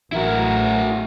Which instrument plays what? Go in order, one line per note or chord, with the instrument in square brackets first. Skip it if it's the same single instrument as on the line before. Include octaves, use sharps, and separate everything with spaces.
[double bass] A1 G#3 [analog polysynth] E3 F#3 A#4 [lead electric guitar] E4 F#4